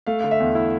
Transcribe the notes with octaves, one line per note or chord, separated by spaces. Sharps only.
A3 F5
D3 F5
E5
E2
E4